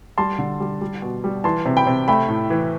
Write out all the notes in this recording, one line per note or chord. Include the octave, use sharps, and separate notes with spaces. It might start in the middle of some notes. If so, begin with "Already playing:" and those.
G3 A5 C6
D3
G3
G3
B2
G3
E3 A5 C6
C3
G5 B5
C3
A3 G5 B5
A2
E3